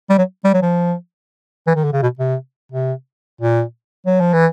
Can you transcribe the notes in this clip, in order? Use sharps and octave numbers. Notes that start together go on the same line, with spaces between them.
G3
F#3
G3
F#3
F3
E3
D#3
D3
C#3
B2
C3
C3
A#2
F#3
F3
E3